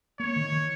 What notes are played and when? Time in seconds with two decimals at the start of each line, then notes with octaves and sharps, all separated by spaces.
0.19 A#3 C#5
0.36 D#3
0.52 D#3